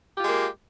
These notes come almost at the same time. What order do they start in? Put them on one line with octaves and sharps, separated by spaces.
G4 F4 G#3 A#3